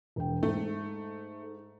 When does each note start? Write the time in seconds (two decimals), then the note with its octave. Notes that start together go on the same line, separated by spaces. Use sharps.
0.16 E1 G5
0.43 G#2 A3